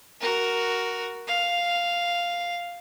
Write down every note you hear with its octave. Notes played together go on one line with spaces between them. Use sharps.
F#4 A#4
F5